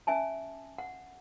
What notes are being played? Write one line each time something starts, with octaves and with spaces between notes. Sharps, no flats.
C#4 E5 G#5 A5
F#5